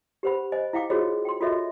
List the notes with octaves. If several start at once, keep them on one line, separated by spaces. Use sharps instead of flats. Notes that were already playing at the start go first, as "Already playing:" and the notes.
G4 B4 C5 F#5 B5
C5 D#5 G#5
E4 F5 G5 D6
F4 F#4 G#4 C5 C#5 D#5
G5 C6
F4 F#4 A4 C#5 D#5 E5